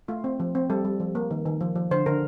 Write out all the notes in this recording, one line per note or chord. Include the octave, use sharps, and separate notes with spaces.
A3 F4
C4
F3
C4
G3 A4
G3
F3
A#3
D#3
D#3
F3
F3
D3 C5
D3 A#4